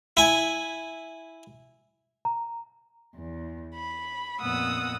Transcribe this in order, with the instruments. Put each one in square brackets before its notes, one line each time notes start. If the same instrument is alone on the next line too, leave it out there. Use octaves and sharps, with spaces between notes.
[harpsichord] E4 G#5
[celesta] A#5
[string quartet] E2
B5
F2 A#2 B3 F#5 D#6 E6